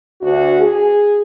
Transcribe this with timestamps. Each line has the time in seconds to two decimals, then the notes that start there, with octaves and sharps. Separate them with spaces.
0.21 D2 F#4
0.60 G#4